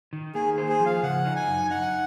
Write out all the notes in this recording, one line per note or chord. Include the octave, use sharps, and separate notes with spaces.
D#3
A#3 G#4
C5
G#4
F3
F5
C#3 F#5
D#4
G#5
F#2
D#4 F#5